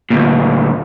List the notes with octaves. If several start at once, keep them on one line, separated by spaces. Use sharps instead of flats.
D2 A#2